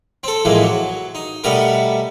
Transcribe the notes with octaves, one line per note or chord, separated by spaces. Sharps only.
C4 A4
A2 E3 F3 G#3 A#3
F#3
D#4
B2 G3 A3 B3 A#4